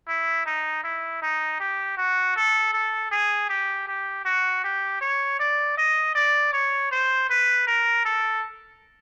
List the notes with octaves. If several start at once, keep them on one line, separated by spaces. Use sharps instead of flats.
E4
D#4
E4
D#4
G4
F#4
A4
A4
G#4
G4
G4
F#4
G4
C#5
D5
D#5
D5
C#5
C5
B4
A#4
A4